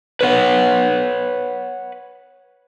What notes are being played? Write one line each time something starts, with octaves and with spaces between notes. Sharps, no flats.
B4 C#5 F#5